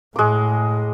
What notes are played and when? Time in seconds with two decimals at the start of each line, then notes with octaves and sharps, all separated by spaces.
0.16 A2 G#3 D6